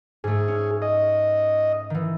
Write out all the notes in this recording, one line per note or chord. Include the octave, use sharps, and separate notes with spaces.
G#2 A3 G#4
C#4
D#5
D#3 E3